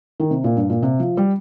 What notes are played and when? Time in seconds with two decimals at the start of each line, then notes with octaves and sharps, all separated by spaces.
0.20 D#3
0.31 C3
0.44 A#2
0.57 G2
0.70 A#2
0.83 C3
1.00 F3
1.17 G3